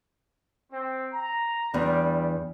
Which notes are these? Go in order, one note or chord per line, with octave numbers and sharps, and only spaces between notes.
C4
A#5
E2 G3 D4